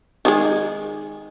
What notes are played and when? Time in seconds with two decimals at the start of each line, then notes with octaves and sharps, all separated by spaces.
0.25 D#3 F#3 G#3